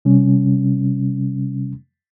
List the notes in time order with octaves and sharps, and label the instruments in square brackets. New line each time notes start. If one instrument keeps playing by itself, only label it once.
[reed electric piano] C3 G3 C#4